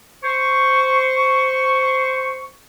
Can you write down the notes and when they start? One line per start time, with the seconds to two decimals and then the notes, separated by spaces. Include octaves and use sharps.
0.24 C5 C#6